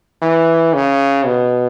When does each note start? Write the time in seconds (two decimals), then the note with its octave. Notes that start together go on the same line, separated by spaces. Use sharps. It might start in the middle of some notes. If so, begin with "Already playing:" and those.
0.22 E3
0.74 C#3
1.26 B2